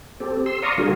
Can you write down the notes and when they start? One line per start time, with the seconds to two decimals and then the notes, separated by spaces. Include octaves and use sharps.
0.20 C4 G4 A4
0.46 C6 E6
0.62 D5 F5 A#5 C6 C#6 D#6
0.78 D3 G3 F4 F#4 G#4 A#4